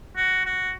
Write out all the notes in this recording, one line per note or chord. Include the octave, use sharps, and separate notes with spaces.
F#4
F#4